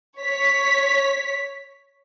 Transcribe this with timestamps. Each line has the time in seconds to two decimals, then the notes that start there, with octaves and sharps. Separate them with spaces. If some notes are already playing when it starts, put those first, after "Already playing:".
0.20 C#5 B6